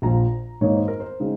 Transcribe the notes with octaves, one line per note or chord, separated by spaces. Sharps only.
A#1 A#2 F3 A#5
G#2 D#3 A#3 D#4 C#5
C5
A#4
C5
C#3 G#3 C4 D#4